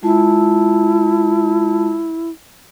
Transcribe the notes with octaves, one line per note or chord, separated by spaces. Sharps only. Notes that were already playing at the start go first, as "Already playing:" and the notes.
G#3 E4 F4 A5